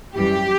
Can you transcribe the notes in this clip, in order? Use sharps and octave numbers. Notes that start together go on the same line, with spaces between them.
F#2 E3 G3 G4